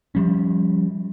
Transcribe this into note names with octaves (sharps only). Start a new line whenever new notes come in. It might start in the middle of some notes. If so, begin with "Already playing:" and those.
F3 G3 C#4